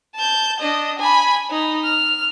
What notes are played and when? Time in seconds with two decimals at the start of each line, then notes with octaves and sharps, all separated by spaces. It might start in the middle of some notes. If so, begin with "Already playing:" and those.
0.16 A5 G6
0.60 D4 D#5
0.99 G#5 B5
1.51 D#4
1.84 F6